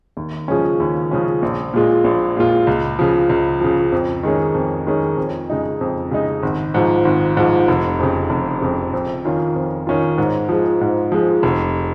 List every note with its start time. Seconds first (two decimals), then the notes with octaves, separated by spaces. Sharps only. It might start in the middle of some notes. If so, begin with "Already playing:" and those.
0.17 D#2
0.48 C#3 F3 G#3 C#4
0.80 D#2
1.11 C#3 F3 G#3 C#4
1.42 A#1
1.74 A#2 G#3 F4
2.04 A#1
2.37 A#2 G#3 F4
2.67 C#2
2.99 C#3 F3
3.29 C#2
3.61 C#3 F3
3.92 F2
4.23 D#3 G#3 C#4
4.55 F2
4.87 D#3 G#3 C#4
5.17 F2
5.50 C#3 G#3 D#4
5.81 F2
6.11 C#3 G#3 D#4
6.43 G#1
6.74 G#2 F3
7.05 G#1
7.37 G#2 F3
7.68 F1
7.99 F2 C#3
8.30 F1
8.62 F2 C#3
8.93 F2
9.25 D#3 C#4 F4
9.56 F2
9.87 D#3 C#4 F4
10.18 G#2
10.49 F3 G#3
10.81 G#2
11.12 F3 G#3
11.43 F1